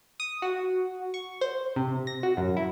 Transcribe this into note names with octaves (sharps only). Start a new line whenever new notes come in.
D#6
F#4
C#6
C5
C3
A#6
F#4
F#2
E4